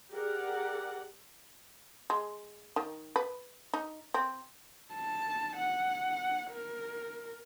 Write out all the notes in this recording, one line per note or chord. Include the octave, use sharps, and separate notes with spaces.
G4 G#4 A#4 D5 F#5
G#3
D#3
B4
D#4
C4
A5
F#5
A#4